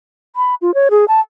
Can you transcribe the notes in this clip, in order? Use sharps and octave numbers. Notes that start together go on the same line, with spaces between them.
B5
F4
C#5
G#4
A5